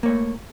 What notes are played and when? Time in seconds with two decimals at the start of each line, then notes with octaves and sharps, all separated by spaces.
0.03 A#3
0.06 C#5
0.08 A3